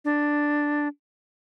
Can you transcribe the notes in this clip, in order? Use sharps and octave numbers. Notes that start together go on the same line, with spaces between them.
D4